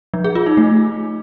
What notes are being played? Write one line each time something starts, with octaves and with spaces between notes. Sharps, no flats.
F3
G#4
F4
D#4
A3